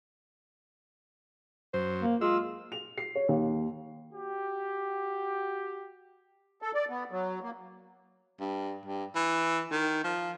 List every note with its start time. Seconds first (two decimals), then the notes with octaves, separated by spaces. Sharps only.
1.74 F#2 C5
2.02 A#3
2.21 G#3 F4 E6
2.72 F7
2.98 C7
3.15 C#5
3.28 D#2
4.13 F#4 G4
6.62 A4
6.75 D5
6.89 B3
7.11 F#3
7.42 A#3
8.40 G2
8.86 G2
9.15 E3
9.71 D#3
10.04 F3